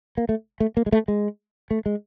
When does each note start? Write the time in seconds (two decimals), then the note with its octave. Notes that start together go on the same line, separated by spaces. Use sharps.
0.17 A#3
0.29 A3
0.60 A3
0.77 A#3
0.86 G#3
0.92 A3
1.08 G#3
1.71 A3
1.86 G#3